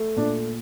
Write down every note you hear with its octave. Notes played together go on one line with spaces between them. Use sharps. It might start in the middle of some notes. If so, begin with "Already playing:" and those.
Already playing: A3
A#2 D4